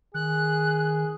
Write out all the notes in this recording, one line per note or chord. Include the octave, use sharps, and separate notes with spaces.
D#3 G#4 F#6